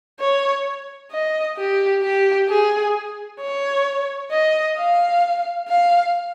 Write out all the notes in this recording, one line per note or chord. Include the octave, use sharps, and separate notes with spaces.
C#5
D#5
G4
G4
G#4
C#5
D#5
F5
F5